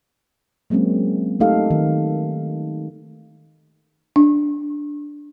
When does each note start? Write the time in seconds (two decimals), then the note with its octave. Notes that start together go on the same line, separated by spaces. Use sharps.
0.70 F#3 G#3 A#3 C4 C#4
1.40 A3 D#4 G4 A4 F5
1.71 D#3
4.16 D4